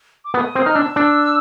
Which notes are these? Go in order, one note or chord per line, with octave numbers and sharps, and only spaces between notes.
D6
B3 D#6
C4
D#4 F6
D4 E6
D4